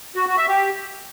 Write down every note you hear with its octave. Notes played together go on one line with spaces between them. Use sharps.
F#4
F#4
E5
G4